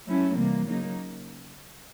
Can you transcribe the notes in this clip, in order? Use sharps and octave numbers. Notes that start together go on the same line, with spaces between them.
F#3 A3 C#4 E4
C3 E3 G3 A#3
C#3 F#3 A#3 D#4